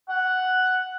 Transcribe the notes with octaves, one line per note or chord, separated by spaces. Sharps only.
F#5